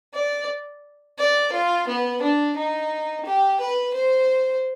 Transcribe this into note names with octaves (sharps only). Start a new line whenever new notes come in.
D5
D5
F4
B3
D4
D#4
G4
B4
C5